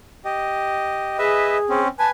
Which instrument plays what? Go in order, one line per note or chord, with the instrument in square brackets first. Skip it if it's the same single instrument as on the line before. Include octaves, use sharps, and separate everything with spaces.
[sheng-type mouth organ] G4 D#5
[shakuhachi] G#4 [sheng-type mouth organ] B4 D#5 E5
[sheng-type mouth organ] C4 C#4
[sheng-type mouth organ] B4 G#5 [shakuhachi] A5